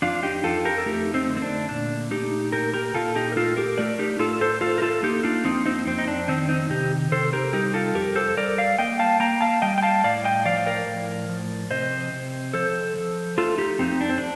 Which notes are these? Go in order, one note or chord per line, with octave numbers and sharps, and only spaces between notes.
F2 D4 F4
D#4 G4
F2 F4 A4
G4 A#4
A4
A3 D#4 G4
C4 D#4
D3
C4
D4
A#2 D4
A3 D#4 G4
A#2 G4 A#4
G4 A#4
A#2 F4 A4
D#4 G4
A#4
A3 F4 A4
G4 A#4
A3 A#4 D5
D#4 G4
A2 F4 A4
A4 C5
A3 F4 A4
A#4
F4 A4
A#3 D#4 G4
D4 F4
F2 C4 D#4
C4 D#4
F2 C4
D#4
D4
D#3 C4 D#4
C4 D#4
C3 D#4 G4
C3 A4 C5
G4 A#4
G3 D#4 G4
F4 A4
F2 G4 A#4
A4 C5
G3 A#4 D5
D5 F5
A#3 D#5 G5
F5 A5
A#3 G5 A#5
F5 A5
G3 D#5 G5
G5
F5 A5
A2 D5 F5
D#5 G5
F3 D5 F5
A#4 D5
A2
F3
C3 C5 D#5
C3
F3 A4 C5
F3
A3 F4 A4
D#4 G4
F2 C4 D#4
D4
C4
D4